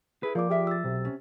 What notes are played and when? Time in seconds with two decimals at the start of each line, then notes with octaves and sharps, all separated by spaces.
0.23 E4 G#4 B4
0.35 F3 A#3 F4 D5 D6
0.50 G4 G#4 A#4 E5
0.67 E6 A6
0.84 B1 C3
1.05 C#4